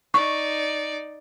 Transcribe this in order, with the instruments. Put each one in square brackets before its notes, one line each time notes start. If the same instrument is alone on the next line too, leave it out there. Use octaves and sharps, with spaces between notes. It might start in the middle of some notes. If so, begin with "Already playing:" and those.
[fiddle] D#4 D5 [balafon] C#6